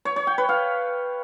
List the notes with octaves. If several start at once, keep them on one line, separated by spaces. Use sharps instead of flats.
C#5
C#5
G5
B4
F5